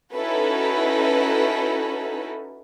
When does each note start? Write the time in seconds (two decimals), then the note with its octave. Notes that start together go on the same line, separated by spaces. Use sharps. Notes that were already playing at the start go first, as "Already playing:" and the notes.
0.15 C#4 D#4 E4 F#4 A4 B4